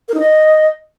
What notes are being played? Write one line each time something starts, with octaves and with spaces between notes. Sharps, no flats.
A#4
D#4
D#5